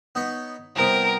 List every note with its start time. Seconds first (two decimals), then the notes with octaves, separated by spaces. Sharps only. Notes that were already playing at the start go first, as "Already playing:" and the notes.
0.15 B3 D#4 C#5
0.76 C2 C3 B3 A#4